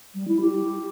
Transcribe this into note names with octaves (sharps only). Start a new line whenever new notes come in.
G3
E4
G4